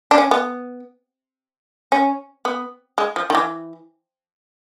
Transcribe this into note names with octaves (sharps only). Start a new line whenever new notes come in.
D4
C#4
B3
C#4
B3
G#3
F3
D#3
E3